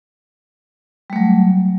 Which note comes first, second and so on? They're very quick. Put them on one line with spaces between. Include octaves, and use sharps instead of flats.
G3 A3 F#3